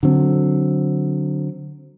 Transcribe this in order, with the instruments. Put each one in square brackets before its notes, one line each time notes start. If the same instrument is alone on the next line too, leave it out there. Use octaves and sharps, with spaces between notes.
[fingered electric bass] D3 F#3 C4